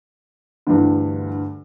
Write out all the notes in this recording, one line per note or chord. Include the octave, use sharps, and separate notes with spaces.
D2 G2 D3 E3